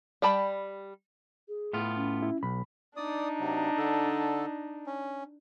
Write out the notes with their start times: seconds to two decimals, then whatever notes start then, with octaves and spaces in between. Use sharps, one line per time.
0.22 G3 D5 G5 A5 B5
1.49 G#4
1.73 A2 B3 F4
1.96 C#4
2.22 E4
2.43 B1 B5
2.96 D4 D#4 D5 D#6
3.40 C3 F#3
3.78 D3 A4
4.87 C#4